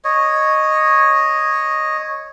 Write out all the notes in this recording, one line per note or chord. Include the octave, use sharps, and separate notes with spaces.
C#5 D#5